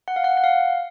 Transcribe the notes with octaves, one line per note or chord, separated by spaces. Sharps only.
F#5
F5
F#5
F#5
F5